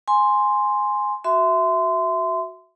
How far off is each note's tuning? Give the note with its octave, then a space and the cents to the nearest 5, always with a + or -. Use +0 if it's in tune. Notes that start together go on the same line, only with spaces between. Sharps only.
G#5 +0 C6 +0
F#4 +0 E5 +0 C6 -25